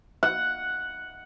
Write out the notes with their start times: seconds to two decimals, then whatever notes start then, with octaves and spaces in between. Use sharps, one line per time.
0.23 F#5